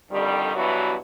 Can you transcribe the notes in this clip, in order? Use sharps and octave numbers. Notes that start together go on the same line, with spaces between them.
F2 D3 D#3 G3
G2 B2 E3 F#3 E4 F#4